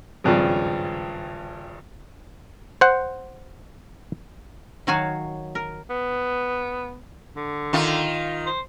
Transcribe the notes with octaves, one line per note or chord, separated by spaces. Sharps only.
G#1 G2 C#3 F3
C5 F#5
D#3 F#3 F#4 C#5 F5 G#5
A#4
B3
D3
D#3 F4
C5